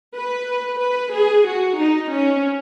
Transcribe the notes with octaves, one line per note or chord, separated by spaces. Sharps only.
B4
B4
G#4
F#4
D#4
C#4